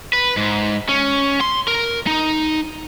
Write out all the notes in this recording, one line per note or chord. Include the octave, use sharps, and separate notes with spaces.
B4
G#2
C#4
C6
A#4
D#4